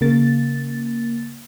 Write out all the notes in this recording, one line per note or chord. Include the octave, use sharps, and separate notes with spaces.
C#3 A#3 A6